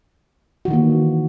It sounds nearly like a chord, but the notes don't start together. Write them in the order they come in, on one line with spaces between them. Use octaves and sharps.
F#4 E3 D#3 A#3